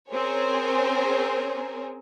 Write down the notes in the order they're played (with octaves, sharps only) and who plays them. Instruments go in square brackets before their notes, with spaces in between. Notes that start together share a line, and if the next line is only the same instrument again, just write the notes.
[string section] C4 C#4 G#4 A#4 C5 C#5